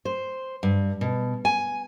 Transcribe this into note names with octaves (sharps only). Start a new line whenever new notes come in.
C5
G2
B2
G#5